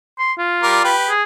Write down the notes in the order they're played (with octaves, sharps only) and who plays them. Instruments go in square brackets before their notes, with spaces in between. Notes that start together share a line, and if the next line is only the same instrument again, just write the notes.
[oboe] C6
F4
[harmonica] G3 A#4 D5
G4 B4
[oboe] G#4